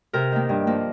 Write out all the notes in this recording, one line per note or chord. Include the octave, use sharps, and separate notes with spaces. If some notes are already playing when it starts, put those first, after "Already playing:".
C3 A#4
D#3 A#3
G2
F3 A#3